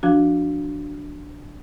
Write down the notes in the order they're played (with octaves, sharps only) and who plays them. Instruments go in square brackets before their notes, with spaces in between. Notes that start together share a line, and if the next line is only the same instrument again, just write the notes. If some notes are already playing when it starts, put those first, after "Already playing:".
[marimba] F3 D4 F#4